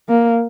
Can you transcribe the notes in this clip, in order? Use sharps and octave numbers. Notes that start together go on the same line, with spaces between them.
A#3